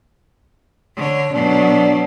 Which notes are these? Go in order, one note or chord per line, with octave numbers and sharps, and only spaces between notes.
D3 C#5
B2 F#3 D4